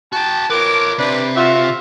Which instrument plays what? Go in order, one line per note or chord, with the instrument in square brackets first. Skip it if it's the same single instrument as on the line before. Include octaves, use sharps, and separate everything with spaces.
[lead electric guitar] F#4 G5 [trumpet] A5
[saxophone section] F3 A#4 [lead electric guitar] B4 C#5 [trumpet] D6
[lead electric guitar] C3 [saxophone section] D4 [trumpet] B4
[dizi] F4 [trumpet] F#4 [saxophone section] E5